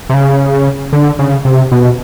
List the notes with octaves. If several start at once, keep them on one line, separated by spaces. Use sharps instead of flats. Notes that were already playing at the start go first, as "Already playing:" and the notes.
C3
C#3
D3
C#3
C3
B2